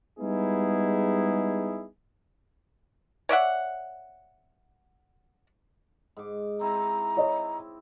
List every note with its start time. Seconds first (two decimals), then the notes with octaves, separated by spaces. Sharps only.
0.19 G3 G#3 B3 D#4 E4 G#4
3.29 C#5 D5 E5 F#5
6.17 G#2 D6
6.61 C4 E4 A#5
7.17 C#5 D#5